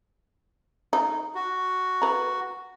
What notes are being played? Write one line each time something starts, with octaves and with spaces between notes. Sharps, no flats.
D#4
F#4
B4 A#5